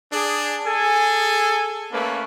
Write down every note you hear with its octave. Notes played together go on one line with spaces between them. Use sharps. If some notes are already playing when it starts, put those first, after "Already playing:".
D4 G#4
G#4 A4 G#5
A3 A#3 C#4 B4